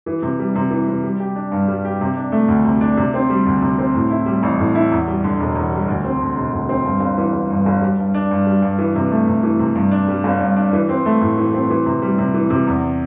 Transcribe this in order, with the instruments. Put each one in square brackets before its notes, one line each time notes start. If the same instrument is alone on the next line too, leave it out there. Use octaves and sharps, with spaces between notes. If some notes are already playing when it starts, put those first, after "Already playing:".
[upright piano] E3
C3
G3
C3
E3
C3
G3
G4
D4
G2
G3
G4
C3
D4
A3
D2
C3
D4
C3
C4
G3
D2
C3
C4
A2
E4
G3
A1
A2
E4
E2
G3
D3
E1
E2
G3
D2
C4
D3
E1
D2
C4
G2
G1
E3
G1
G2
G1
G3
G2
D4
G2
G3
G2
E3
C3
A3
C3
E3
C3
G2
D4
G3
G1
G2
D4
E3
C4
A3
A2
E3
C4
E3
C3
G3
C3
E3
C3
E2